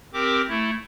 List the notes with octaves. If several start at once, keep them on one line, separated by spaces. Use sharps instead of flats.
C4 G4 A#4 D6
A3 E4